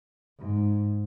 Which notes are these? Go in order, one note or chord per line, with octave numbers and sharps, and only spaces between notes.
G#2